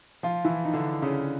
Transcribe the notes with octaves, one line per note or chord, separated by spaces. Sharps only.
F3 F4
E3 E4
D#4
D3 D4
C#3 C#4